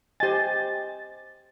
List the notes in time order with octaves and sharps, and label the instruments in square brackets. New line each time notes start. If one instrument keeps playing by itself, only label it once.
[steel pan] G4 G#5 [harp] C5 D#5 [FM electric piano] A6